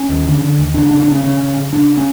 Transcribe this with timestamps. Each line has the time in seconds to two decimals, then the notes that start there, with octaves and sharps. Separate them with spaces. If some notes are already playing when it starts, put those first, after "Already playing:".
Already playing: C#4
0.09 D#2
0.25 D3
0.41 D3
0.59 D#2
0.74 C#3 D4
0.86 D4
0.91 C#3
1.00 D4
1.08 C#3 C#4
1.23 C#3 C#4
1.40 C#3
1.57 C#3
1.73 C#3 D4
1.97 C#4